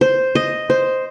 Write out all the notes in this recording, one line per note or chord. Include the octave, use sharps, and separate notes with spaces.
C5
D#5
C5